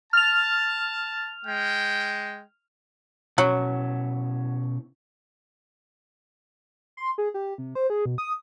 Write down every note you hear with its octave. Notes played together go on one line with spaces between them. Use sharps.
A5 F6 F7
G#3 G5
B2 F#3 C#4 E4
C6
G#4
G4
C3
C5
G#4
B2
D#6